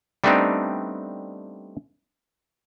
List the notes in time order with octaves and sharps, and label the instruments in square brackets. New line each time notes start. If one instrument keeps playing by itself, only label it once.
[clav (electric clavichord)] G3 A3 B3 C4 D4 D#4